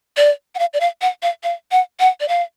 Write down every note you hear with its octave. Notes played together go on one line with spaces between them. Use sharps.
D5
F#5
F5
D5
F5
F#5
F5
F5
F#5
F#5
D5
F5